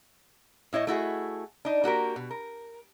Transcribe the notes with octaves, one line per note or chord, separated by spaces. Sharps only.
A2 E4 C#5 D#5
A3 E4 F#4 G#4
D4 D#4
A#3 F#4 G4 A#4
B2
A#4